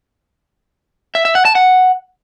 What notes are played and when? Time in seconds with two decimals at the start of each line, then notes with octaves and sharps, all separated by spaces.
1.15 E5
1.25 E5
1.35 F#5
1.45 A5
1.55 F#5